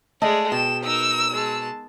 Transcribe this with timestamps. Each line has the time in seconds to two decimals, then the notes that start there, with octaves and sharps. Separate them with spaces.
0.22 G#3 A3 D5 D#5
0.52 B2 G5 E7
0.84 D#4 A#4 E6
1.31 G#3 A5